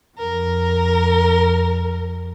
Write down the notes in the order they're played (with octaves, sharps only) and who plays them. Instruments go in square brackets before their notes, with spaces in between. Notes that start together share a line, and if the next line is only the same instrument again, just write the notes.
[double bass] F2 [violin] A#4